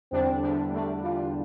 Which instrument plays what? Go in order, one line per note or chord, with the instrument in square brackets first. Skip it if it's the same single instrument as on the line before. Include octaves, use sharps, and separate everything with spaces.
[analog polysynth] E2 D3 G3 D4 [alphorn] C4
[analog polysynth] E2 D3 G3 D4
[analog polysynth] E2 D3 G3 D4 [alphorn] A3
[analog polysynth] E2 D3 G3 D4 [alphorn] F4